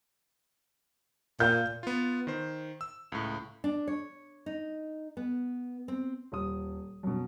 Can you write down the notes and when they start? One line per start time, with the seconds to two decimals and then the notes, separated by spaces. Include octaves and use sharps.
1.40 A#2 F5 G6
1.83 B3 F4
2.27 D#3 C5
2.81 E6
3.12 C#2 A2
3.64 D4
3.87 C#5
4.46 D#4
5.17 B3
5.88 C4
6.32 D#1 D#6
7.03 F#2 B2